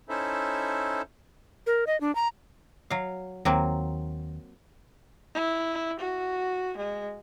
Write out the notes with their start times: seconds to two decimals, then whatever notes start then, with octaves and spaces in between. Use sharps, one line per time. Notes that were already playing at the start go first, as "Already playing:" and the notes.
0.09 C#4 D#4 E4 A4 C5 E5
1.67 A#4
1.87 D#5
2.01 D4
2.15 A#5
2.90 F#3 F5
3.45 D#2 F#3 A#3 C4
5.35 E4
5.99 F#4
6.77 G#3